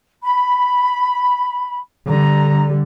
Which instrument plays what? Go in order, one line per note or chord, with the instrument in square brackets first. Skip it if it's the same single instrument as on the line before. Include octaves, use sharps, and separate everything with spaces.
[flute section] B5
[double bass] D3 G3 [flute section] A#5